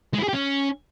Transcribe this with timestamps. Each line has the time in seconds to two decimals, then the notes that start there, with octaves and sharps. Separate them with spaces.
0.13 G#3
0.18 E4
0.23 G#4
0.28 G4
0.33 C#4